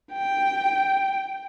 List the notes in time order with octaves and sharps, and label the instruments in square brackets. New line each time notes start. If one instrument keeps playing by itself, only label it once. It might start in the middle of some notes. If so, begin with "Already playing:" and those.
[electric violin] G5